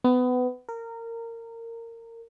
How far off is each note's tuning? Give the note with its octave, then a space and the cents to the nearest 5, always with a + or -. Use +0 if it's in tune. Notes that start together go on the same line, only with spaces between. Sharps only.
B3 +25
A#4 -20